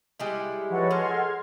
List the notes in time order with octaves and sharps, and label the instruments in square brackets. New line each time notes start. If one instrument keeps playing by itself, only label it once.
[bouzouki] G3 G#3 E4
[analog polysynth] F3 B4 C#5 [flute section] A4 D#5 F#5
[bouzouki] G#3 [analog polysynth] C6 F6 G#6